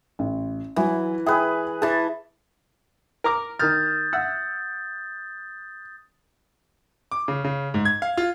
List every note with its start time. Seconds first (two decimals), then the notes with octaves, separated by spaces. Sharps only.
0.19 A1
0.76 E3 F#3 G#5
1.26 G#4 B4 E5 G5 G#5
1.82 E3 G#4 A5
3.24 A#4 A#5 D6
3.59 D#3 D#6 F6 G6 A6
4.13 E5 F#5 E6
7.11 D6
7.28 C#3
7.44 C#3
7.74 G#2
7.85 G#6
8.02 F5
8.17 F4